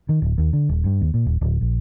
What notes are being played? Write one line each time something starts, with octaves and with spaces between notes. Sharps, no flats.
D#3
D1
D#2
D3
D#1
G2
D#2
A#2
D#1
D1
A#1